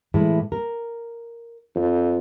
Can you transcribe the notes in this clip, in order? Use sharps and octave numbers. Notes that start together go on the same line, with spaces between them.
A2 E3 G#3
A#4
F2